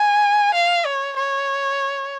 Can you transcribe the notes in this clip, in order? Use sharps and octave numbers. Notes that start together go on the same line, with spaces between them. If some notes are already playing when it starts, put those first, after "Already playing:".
Already playing: G#5
F5
C#5
C#5